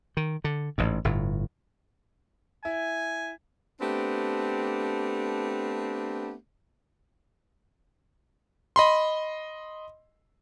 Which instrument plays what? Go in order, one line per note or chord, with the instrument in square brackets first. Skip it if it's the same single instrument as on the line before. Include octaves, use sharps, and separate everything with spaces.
[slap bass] D#3
D3
A1 G#2
G1 A2
[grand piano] E4 [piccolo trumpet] G#5
[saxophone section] A3 B3 C4 D4 G4
[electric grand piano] D#5 B5 C6